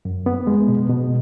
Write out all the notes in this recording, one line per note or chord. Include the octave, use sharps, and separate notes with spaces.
F#2
B3
G#3
B2
B2